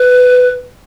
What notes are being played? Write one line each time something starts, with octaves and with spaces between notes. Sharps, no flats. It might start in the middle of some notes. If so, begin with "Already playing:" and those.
Already playing: B4